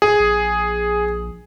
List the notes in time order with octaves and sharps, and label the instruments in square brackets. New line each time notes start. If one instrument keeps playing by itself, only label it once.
[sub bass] D1 [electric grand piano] G#4
[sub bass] A#1